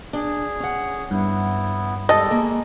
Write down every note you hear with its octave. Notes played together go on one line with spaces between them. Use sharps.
D4 G#4
C#4 F#5
G2 B3 E4
G3 G#3 G4 A4 D#5
A#3 G#4